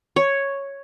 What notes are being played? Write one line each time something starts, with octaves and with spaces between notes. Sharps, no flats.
C#5